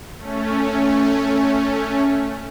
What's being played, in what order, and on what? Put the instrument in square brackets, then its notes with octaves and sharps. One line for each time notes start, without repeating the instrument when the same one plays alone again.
[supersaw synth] A3 C#4